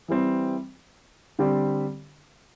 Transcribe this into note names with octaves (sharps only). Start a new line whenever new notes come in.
E3 G3 C4
D3 G3 C4 G4 D5